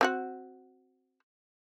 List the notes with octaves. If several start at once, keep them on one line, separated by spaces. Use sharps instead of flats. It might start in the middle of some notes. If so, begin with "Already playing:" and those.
C4 F#4 F#5